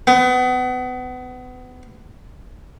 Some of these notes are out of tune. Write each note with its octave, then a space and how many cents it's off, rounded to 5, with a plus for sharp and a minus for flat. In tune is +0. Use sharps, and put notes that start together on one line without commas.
B3 +30